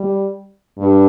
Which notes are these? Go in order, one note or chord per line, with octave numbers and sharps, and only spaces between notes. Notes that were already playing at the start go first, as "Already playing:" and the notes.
Already playing: G3
G2